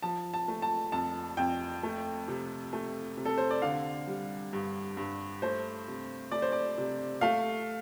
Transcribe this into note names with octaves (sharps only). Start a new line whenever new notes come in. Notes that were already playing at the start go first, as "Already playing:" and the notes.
F3 A5
A5
A3
A5
F2 A5
F2 G5
A3
C3
A3
C3
A4
C5
D5
D3 F5
G3
G2
G2
A3 C5
C3
A3 D5
C5
D5
C3
A3 F5